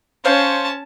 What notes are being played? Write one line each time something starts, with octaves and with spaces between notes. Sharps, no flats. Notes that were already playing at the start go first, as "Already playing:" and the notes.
C#4 C5 C#5 F5 A5